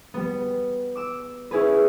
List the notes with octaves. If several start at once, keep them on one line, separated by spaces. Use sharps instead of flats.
G3 B3
D6 E6
C#4 E4 G#4 B4